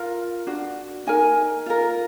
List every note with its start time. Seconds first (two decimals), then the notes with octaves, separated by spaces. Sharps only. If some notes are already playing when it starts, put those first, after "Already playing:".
Already playing: F4 A#4
0.47 D4 F#4
1.07 D#4 A#4 G#5
1.66 F4 A#4